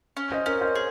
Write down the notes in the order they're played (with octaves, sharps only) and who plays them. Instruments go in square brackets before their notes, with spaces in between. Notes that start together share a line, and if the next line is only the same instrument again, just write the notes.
[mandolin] C#4
[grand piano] C5 D#5
[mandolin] C#4 [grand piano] A#4 C#5
[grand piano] C5 D#5
[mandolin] G#4